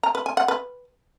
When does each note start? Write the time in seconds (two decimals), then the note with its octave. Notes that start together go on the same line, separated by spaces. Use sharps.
0.03 A#5
0.15 B4
0.26 G#5
0.37 F#5
0.48 B4